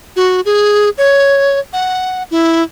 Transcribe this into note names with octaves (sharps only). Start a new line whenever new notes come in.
F#4
G#4
C#5
F#5
E4